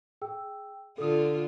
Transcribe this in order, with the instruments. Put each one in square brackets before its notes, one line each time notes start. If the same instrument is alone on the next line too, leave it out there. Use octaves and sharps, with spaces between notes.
[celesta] G#4 G5 E6
[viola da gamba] D3 F4 [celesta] A4 D#6